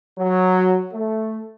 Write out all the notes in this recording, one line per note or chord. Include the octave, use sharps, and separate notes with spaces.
F#3
A3